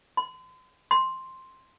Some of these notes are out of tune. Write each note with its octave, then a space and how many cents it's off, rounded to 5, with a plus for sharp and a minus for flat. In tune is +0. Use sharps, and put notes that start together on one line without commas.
C6 -40
C6 +5